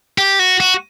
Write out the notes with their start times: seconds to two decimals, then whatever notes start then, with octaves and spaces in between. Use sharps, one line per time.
0.18 G4
0.39 F#4
0.60 F#4